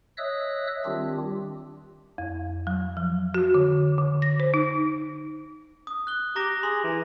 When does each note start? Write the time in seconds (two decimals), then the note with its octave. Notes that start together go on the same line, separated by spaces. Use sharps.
0.18 C#5 D#5 E5 D#6 E6 F#6
0.85 D#3 G3 C4 D4 F4 G4
2.18 F2
2.67 F#3
2.97 F3
3.34 F#4
3.54 D3
3.98 D3
4.22 A#6
4.40 C5
4.54 D#4
5.87 D#6
6.07 F#6 G7
6.36 G4 A#5 D6 A#6
6.63 G#4 C6
6.84 E3